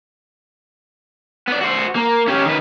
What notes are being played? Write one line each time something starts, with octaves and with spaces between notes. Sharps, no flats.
B3 D5
F#4 C5
A#3
C#4 G4
D#3 B4